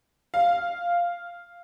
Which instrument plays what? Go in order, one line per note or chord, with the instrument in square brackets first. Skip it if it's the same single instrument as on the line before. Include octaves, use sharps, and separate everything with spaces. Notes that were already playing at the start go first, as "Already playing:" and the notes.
[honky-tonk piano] F5